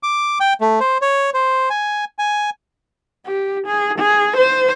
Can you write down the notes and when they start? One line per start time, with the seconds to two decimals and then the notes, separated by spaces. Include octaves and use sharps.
0.03 D6
0.40 G5
0.61 A3
0.80 C5
1.02 C#5
1.34 C5
1.70 G#5
2.19 G#5
3.26 G4
3.67 G#4
3.99 G#4
4.37 C5